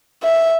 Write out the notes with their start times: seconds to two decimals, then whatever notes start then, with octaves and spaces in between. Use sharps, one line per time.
0.23 E5